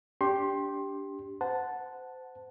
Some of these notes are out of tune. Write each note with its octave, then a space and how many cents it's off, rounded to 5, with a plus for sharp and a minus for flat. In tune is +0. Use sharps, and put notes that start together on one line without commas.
D4 -20 G4 +0 C6 +20
C5 -25 F#5 -5 A5 +0